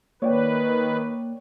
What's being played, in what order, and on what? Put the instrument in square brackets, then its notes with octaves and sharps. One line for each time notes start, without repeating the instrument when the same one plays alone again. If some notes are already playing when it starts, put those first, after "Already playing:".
[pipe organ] D#3 B4 [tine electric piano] A#3 [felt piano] C#5 D5 G5